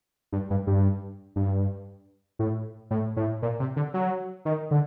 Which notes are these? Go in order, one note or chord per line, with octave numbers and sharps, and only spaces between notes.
G2
G2
G2
G2
A2
A2
A2
A#2
C3
D3
F#3
D#3
D3